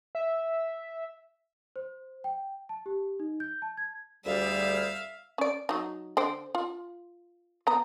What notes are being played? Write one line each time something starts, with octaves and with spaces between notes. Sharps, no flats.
E5
C5
G5
A5
G4
D#4
G6
A5
G#6
D2 G3 G4 G#4 D5 E5 F5
C#4 D5
F#3 D#4
D3 C5 G5
F4
B3 A#5